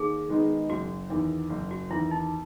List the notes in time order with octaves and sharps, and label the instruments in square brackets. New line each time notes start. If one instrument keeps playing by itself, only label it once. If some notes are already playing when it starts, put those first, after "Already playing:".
Already playing: [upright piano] D#2 [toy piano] G#4
[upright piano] D#3 G#3 B3 D#4
[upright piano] F#1 [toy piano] F#4
[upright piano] E2 D#3
F#1
[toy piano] F#4
[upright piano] E2 D#3 [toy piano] E4
[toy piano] D#4